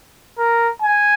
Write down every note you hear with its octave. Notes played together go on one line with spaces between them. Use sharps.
A#4
G#5